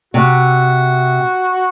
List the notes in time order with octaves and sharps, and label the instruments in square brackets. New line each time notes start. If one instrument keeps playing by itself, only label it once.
[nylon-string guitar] C3 [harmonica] F#4